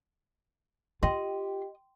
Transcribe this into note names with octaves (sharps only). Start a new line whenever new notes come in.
F4 G4 D#5 G5 C6